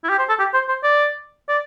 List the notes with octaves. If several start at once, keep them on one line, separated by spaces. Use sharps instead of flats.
E4
G4
C5
A4
G4
C5
C5
D5
D5